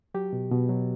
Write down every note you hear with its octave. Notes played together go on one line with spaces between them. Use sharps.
F#3 G4
B2
B2
F#3